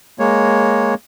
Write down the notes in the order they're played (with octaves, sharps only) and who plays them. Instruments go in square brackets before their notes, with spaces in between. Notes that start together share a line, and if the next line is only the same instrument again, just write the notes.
[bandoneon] G#3 A#3 C#5